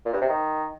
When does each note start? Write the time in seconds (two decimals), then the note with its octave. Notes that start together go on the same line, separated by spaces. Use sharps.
0.05 A#2
0.13 G2
0.21 C3
0.29 D#3